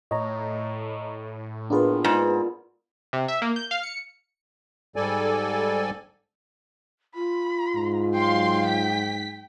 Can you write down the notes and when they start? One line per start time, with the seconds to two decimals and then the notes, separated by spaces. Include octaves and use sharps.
0.11 A2 C#5 D#5 A#5
1.70 A#3 B3 D4 F4 G#4 B4
2.04 G#2 D5
3.13 C3
3.28 E5
3.42 A#3
3.56 G6
3.71 F5
3.83 C#7
4.96 G#2 G3 A4 D5 G#5
7.15 F4 B5
7.75 G#2
8.14 F#3 F5 G5 C6
8.67 B6